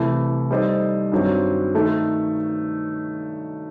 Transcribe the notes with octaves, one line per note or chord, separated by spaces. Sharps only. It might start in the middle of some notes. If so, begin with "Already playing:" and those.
Already playing: C2 C3 E3 A3 E4
G3 D#4 A4 C5 D#5
G2 D#3 F#3 C4
D#3 A3 D#4